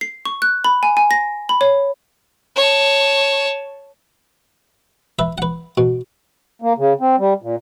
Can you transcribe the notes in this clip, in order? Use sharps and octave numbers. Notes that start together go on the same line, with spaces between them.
C7
C#6
F#6
B5
G#5
G#5
A#6
B5
C#5
C#5 A5
B4 E5
B4 F#5
B2
A#3
C#3
C4
G3
A#2